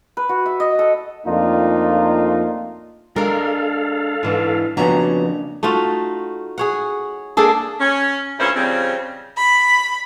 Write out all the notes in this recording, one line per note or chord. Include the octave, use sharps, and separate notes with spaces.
B4
F#4
E5
D#5
A4
F2 A3 A#3 D4 D#4 F4
G#3 D4 A4 A#4 F5
G#2 E3 D4
F2 C#3 A#3 B3 C#4 D4 F#4 A#5
A3 D#4 F4 F#4
G#4 C#5 F#5
A#3 D4 G#4 A4
C#4
D2 A#2 C#4 E4 B4 C5
C#3 F3 G3 C4
B5